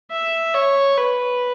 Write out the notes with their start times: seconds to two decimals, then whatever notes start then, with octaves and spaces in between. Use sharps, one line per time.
0.11 E5
0.54 C#5
0.97 B4